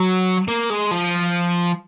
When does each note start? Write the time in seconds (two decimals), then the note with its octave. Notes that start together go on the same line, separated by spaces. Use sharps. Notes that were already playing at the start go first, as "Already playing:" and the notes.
Already playing: F#3
0.48 A#3
0.70 G#3
0.92 F3